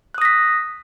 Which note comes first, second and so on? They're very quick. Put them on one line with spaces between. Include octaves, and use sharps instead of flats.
F#6 D#6 A#6 B6